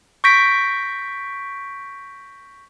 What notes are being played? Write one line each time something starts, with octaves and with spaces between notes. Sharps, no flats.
C#6 G6 A#6 B6 D7